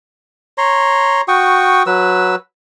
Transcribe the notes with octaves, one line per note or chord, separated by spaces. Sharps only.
C#5 A#5 C6
F#4 G5 C#6 D#6
F#3 B4 E6